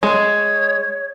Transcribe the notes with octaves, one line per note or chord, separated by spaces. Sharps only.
G#3 C#5